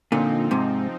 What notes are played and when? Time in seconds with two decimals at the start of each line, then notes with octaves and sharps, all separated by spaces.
0.12 A#2 D3 F3 C4 D#4
0.51 G#2 C3